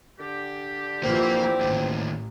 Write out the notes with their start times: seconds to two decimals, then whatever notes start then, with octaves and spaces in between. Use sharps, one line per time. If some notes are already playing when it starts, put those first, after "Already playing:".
0.20 D3 G4
1.03 A#2 E3 F3 A#3 C4
1.61 A1 D#2 A2